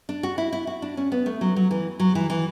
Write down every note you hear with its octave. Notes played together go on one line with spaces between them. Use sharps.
D4
F#4
E4
E4
F#4
D4
C#4
B3
A3
F#3
F#3
E3
F#3
E3
E3